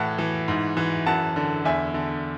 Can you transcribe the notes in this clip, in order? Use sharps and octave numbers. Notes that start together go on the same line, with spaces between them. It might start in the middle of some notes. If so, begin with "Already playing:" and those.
Already playing: A2 E3 F#5 A5
E3
G#2
E3
F#2 F#5 A5
D3
E2 E5 G#5
D3